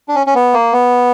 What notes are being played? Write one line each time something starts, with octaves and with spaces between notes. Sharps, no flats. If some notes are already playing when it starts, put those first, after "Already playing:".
D4
C#4
C#4
B3
A#3
B3